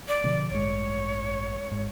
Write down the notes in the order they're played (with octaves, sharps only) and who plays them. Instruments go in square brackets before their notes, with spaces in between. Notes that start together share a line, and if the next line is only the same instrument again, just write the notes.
[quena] D5
[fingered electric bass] B2 D3 F3
[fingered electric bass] A1 G2 G#3 [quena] C#5
[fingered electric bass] G#1 G#2